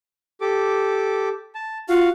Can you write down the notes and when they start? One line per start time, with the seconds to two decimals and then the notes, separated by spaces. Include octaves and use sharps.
0.41 G4 A4 D6
1.55 A5
1.89 F4 F#4 F5